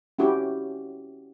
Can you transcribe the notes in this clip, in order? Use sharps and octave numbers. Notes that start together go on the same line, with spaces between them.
C#4 E4 F#4 G4